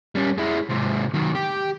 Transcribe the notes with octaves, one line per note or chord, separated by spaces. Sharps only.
G3 C#4
G#3 E4
G#2 C3
D#3 F#3
G4